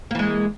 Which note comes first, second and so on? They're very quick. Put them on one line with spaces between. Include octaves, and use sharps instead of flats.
A#3 E3 G#3